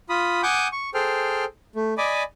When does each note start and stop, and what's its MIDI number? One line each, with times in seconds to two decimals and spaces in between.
0.09 0.42 65
0.09 0.42 83
0.09 0.42 87
0.43 0.68 78
0.43 0.68 80
0.43 0.68 86
0.43 0.68 87
0.43 0.68 91
0.72 0.90 85
0.94 1.45 68
0.94 1.45 69
0.94 1.45 72
0.94 1.45 79
0.94 1.45 89
1.76 1.94 57
1.98 2.23 74
1.98 2.23 75
1.98 2.23 80
1.98 2.23 83
1.98 2.23 86